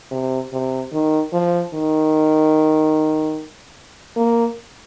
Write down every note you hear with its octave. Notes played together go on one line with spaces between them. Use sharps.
C3
C3
D#3
F3
D#3
A#3